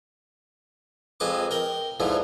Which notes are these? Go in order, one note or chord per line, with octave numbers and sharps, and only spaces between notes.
F2 G#3 B4 D6
A#4 G5
G#2 D3 E3 F3